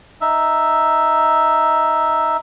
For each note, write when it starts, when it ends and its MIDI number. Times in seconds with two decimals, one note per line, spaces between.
0.21 2.37 63
0.21 2.37 76